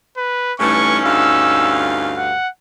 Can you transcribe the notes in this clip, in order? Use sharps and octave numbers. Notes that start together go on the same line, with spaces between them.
B4
G2 E3 A3 C#4 D#4 C#6
D2 G2 F5 E6
F#5